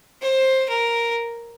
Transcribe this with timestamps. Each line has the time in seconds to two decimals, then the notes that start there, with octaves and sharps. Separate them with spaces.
0.22 C5
0.70 A#4